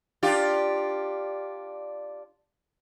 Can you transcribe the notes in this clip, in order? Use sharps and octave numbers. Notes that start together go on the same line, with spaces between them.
D4 F4 G4